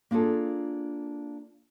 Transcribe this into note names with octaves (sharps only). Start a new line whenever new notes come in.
A#3 D4 F4 G#4 A4